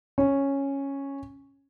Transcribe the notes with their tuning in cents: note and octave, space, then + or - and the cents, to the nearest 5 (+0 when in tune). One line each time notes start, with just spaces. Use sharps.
C#4 -5